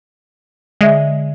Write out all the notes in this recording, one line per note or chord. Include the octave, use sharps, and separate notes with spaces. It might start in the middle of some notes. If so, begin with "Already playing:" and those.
D3 G#3 E5